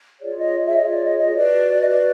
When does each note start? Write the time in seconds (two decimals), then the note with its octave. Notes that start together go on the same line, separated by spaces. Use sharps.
0.20 F4 G#4 C#5 D5
0.38 D#5
0.67 E5
0.76 F4 G#4 C#5 D#5
0.90 D5
1.04 D#5
1.18 D#5
1.32 F#4 B4 D5
1.79 D#5
1.88 F#4 B4 D5